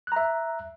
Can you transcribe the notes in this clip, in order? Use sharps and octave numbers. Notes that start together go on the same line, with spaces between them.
E5 A#5 F#6